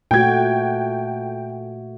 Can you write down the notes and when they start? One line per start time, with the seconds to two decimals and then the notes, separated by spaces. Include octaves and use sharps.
0.11 A#2 A3 F#4 G5 G#6